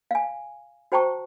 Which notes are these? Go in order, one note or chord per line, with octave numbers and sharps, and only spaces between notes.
F5 G#5
F#4 C5 G5 A5 A#5 C#6